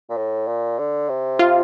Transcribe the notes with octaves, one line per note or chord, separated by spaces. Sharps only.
A#2
A2
A#2
D3
C3
F4